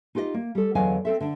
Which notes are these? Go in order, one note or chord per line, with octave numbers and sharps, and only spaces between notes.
D#4 F4 G4 B4 D#5
A#3
G3 A4
E2 D3 F#3 D#5 F5 G#5
C4 A4 E5
D3 D4